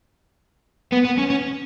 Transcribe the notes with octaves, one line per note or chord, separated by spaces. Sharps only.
B3
B3
C#4
C#4